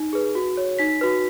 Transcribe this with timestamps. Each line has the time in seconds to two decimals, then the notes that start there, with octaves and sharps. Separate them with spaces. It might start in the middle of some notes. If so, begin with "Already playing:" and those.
Already playing: D#4
0.13 G#4 B4
0.35 F#4
0.57 C#5
0.79 D#4 B6
1.01 F#4 B4